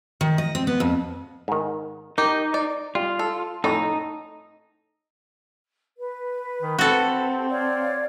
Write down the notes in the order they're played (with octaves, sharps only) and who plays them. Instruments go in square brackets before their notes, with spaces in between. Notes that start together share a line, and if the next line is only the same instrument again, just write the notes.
[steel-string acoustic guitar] D#3
D#5
C4
B3
F2
[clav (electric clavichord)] G#2 D#3
[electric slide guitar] D#4 [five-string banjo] G4 [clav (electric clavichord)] A#4
[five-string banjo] D5
[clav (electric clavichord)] G3 [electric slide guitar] F4
[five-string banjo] A4
[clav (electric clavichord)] F2 A2 C#4 [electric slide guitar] D#4 [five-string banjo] A4
[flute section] B4
[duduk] D#3
[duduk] C4 [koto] F#4 A4
[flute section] G4
C#5 D5 F5